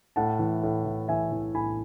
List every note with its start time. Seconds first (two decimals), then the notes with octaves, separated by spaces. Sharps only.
0.16 A2 F#5 A5
0.39 E3
0.63 A2
0.86 E3
1.08 E3 E5 G#5
1.32 E3
1.54 A2 G#5 B5